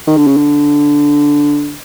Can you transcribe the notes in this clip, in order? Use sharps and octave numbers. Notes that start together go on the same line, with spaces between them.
D#3
D3
C#3
D3